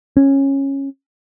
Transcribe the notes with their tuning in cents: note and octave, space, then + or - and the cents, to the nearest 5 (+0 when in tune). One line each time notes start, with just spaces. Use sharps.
C#4 -15